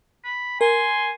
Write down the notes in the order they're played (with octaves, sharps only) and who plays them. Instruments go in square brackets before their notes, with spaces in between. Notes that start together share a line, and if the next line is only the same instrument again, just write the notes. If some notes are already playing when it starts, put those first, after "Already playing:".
[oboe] B5
[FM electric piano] A#4 [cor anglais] G#5 [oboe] C6